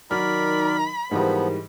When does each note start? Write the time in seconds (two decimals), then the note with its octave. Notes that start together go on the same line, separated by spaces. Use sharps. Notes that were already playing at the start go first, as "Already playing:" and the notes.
0.11 D#3 F#3 D#4 A#4 D5 B5 F6
1.11 G#2 E3 F3 G3 B3 A#4 C5